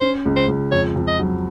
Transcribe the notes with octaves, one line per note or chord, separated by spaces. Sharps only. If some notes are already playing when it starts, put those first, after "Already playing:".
C#4 C5
C#2
C5
C#2
F2 C#5
F2
D#5
F#3